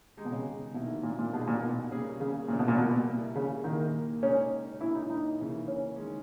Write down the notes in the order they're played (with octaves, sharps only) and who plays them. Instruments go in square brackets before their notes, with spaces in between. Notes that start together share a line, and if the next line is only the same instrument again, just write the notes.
[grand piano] D#3 G#3 D#4 G4
[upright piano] B2
C#3
[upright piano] B2 [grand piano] D#3 G3 A#3 E4
[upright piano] A#2
A#2
[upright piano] B2 [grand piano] G3 B3 D#4 G#4
[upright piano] A#2
B2
[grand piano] C#3 G3 A#3 C#4 G#4
[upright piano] C#3
[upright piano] A#2 [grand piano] C#3 G3 A#3 E4
[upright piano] B2
A#2
B2
[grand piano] G3 A#3 E4
[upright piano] C#3
[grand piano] A#2 A#3 E4 G#4 [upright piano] D#3
[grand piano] C#3 G#3 D#4 G4 [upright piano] C#4
[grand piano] A#2 A#3 C#4 [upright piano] E4
[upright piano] D#4
D#4
[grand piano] C#3 E3 A#3
[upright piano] C#4
[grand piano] D#3 G#3 C#4